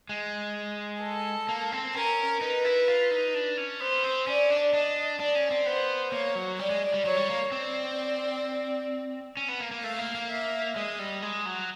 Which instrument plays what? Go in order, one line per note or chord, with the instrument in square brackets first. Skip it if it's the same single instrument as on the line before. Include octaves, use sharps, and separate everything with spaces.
[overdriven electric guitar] G#3
[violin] A4
[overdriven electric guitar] A#3
C4
[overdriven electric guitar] C#4 [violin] A#4
[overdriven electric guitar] D#4 [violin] B4
[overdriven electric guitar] E4
F4
D#4
D4
C#4
[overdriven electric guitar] B3 [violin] C5
[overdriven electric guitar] C4
[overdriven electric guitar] C#4 [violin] D5
[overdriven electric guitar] D4
[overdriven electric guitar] D4 [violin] D#5
[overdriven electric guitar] D4 [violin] D5
[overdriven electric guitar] C#4
C4
[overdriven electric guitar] B3 [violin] C5
[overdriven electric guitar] A#3 [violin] C#5
[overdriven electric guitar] F#3
[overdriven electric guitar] G3 [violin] D5
[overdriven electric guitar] G#3
G3
[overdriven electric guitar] F#3 [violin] C#5
[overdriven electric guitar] G3
A#3
[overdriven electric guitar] C4 [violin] D5
[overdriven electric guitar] C#4
B3
A#3
A#3
[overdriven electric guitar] A3 [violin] F5
[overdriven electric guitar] A#3
A#3
[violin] E5
[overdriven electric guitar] G#3 [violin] D#5
[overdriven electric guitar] G3
G#3
F#3